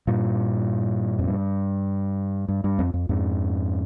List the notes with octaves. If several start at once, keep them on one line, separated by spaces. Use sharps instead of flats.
G2 A#2
F2
G2
G2
G2
F2
F2
F2 G#2